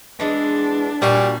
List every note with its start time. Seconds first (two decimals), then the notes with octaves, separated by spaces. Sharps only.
0.20 E3 G#3 B3 D4
1.02 A#2 G3 F#4 F5